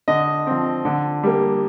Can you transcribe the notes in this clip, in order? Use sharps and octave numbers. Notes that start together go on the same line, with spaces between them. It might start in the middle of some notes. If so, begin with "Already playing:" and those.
D3 D#5
F3 C4
D3
G3 A#3